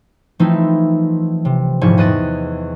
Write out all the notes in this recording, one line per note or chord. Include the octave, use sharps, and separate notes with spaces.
E3 F3 A3 C4 D#4 E4
C3
D#1 G#2 F3 E4 G#5 C#6
E2 D#5 F#6 A6 D#7